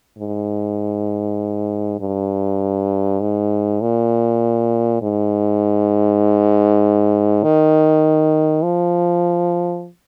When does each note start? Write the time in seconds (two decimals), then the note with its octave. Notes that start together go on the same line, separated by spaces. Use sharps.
0.18 G#2
2.00 G2
3.21 G#2
3.81 A#2
5.02 G#2
7.43 D#3
8.64 F3